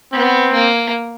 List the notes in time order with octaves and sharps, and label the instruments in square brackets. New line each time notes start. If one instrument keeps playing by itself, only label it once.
[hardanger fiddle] B3 [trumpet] C4
[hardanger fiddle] A#3